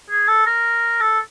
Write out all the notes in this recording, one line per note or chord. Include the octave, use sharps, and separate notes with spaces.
G#4
A4
A#4
A4